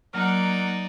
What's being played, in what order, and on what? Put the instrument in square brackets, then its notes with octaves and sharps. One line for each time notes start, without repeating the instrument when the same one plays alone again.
[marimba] F#3 F6 [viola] A#3 F#5 [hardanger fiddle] D#4 D5